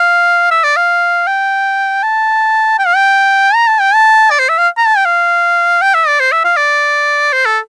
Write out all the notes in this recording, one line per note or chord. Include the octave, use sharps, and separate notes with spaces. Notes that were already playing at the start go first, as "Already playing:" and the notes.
Already playing: F5
E5
D5
F5
G5
A5
G5
F5
G5
A#5
A5
G5
A5
D5
C5
E5
F5
A#5
A5
G5
F5
G5
E5
D5
C5
E5
F5
D5
C5
A4